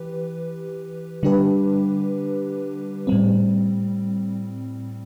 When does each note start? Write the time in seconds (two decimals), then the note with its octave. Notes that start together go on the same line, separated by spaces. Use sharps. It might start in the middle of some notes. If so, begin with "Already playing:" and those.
Already playing: E3 G4 B4
1.23 D3 G3 D4 G4 B4
3.07 A2 G3 C4